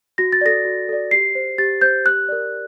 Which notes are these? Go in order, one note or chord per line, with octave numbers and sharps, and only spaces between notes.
F#4 A#6
A6
A4 D5 A#6
F#4
A4 D5
G4 C7
C5
G4 A6
C5 G6
G4 F#6
A#4 D5